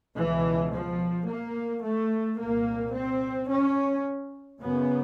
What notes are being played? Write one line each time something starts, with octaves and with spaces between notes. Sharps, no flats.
C#2 B2 E3
F3
A#3
A3
C2 A#2 A#3
C4
C#4
F#2 C#3 B3